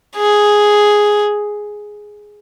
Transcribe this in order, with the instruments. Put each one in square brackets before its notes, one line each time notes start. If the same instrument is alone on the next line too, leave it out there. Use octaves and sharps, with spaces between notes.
[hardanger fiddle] G#4